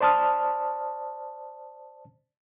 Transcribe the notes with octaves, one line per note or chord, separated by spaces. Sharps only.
C5 D5 A5 D#6 F6